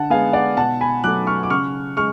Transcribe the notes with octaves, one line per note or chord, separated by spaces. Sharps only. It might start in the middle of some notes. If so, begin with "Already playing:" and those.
Already playing: D3 F#5 A5
G#3 B3 F5 G#5
D5 F#5
B2 F#5 A5
G#5 B5
F#3 A3 D6 F#6
C#6 F6
D6
C#3 C#6 F6
G#3 C#6 F6